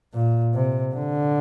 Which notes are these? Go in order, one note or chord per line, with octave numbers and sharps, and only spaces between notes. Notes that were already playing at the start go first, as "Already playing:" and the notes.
A#2
C3
D3